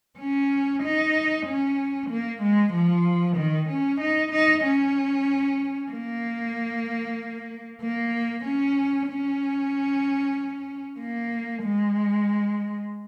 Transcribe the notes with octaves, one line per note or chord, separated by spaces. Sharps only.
C#4
D#4
C#4
A#3
G#3
F3
D#3
C#4
D#4
D#4
C#4
A#3
A#3
C#4
C#4
A#3
G#3